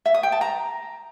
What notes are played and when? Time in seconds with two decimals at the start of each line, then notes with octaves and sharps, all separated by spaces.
0.06 E5
0.14 D#6
0.23 G5
0.32 A5
0.41 A#5